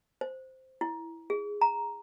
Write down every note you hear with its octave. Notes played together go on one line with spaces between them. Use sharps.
C5
E4
G#4
A#5